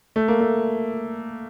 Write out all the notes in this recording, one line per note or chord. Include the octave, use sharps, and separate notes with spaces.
A3
A#3
A3